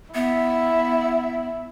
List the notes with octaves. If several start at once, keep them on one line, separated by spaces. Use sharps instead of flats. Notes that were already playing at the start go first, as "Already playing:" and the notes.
B3 E4 E5